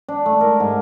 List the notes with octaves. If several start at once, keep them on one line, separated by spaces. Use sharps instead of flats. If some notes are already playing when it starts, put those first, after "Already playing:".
D4
A3
A#4
G#2